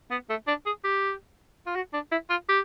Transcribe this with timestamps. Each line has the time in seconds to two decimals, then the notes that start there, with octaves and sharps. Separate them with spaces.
0.11 B3
0.30 A3
0.48 D4
0.66 G#4
0.84 G4
1.67 F4
1.75 F#4
1.94 D4
2.11 E4
2.30 F4
2.49 G4